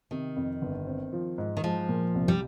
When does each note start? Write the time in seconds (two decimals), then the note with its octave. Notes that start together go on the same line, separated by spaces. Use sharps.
0.11 C3 D#3
0.36 F2
0.62 G1
0.87 C4
1.13 F3
1.38 G#2
1.57 D#3
1.64 F3 G#3
1.89 A#2
2.15 C2
2.28 G3